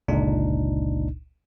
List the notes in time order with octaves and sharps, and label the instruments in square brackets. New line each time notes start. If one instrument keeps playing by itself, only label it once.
[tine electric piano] G1 C#2 A#2 D4 D#4